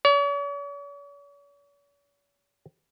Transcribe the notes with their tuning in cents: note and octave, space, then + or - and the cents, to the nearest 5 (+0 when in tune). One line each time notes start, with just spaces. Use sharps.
C#5 +45